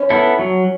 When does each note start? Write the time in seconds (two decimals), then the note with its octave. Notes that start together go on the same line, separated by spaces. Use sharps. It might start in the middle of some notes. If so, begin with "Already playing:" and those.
Already playing: C#4
0.10 B3 E4 A4
0.39 F#3